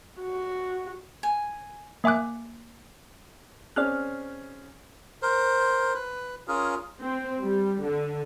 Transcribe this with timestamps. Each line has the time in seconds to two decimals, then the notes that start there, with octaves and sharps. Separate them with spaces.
0.20 F#4
1.23 G#5
2.04 A#3 E5 G#5 D6 F#6
3.76 C4 C#4 G#4 D5 F6 F#6
5.22 A#4 C5
5.95 B4
6.48 C#4 F4 G#4 A#4
7.01 C4
7.41 G3
7.84 D3